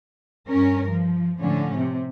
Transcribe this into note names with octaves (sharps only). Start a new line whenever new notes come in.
G2 C#4 A#4
F3
A2 D3 F3 C#4
C3